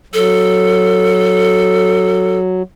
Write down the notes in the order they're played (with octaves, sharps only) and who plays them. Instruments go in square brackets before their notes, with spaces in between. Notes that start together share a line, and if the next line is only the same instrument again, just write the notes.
[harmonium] F#3 [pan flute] A4